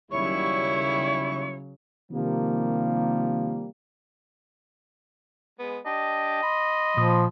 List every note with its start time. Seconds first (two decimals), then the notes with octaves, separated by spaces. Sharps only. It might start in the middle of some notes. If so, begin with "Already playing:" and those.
0.11 D#2 C#3 F#3 G3 E4 C#5 C#6
2.12 C3 D#3 F3 G3 A#3
5.59 G#3 B3
5.86 D4 G4 D#5
6.43 B5 C6
6.97 A#2 F3 D#6